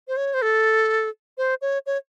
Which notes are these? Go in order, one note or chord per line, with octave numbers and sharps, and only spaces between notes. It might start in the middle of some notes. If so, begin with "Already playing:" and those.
C5
C#5
C5
A4
C5
C#5
C#5